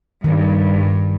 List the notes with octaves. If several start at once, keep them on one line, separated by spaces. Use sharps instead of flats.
G2 D#3